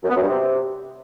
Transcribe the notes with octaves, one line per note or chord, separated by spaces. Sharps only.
F#2
B3
F#2
G2
C3